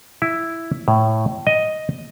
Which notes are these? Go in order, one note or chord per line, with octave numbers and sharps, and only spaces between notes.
E4
A2
D#5